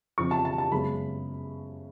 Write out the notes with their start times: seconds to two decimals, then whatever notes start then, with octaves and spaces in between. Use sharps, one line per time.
0.18 F2 C#3 F3 C#6
0.31 A5
0.45 A5
0.58 A5
0.71 F#2 C#3 G#3 B3 B5